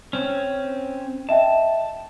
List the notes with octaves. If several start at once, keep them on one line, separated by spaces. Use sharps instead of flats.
C4 C#4
D#5 E5 G5 A5